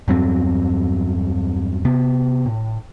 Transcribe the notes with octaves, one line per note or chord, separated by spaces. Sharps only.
E2 G2 F#3 C4
C3 B3
A2